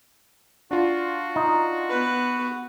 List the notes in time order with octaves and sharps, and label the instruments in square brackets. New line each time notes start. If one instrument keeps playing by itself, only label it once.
[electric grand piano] D4 F4 [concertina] F#4
[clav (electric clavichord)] D#4
[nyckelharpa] B3 B4